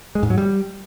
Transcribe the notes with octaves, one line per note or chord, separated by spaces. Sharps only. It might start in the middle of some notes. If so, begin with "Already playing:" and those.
G#3
G#2
F#3
G3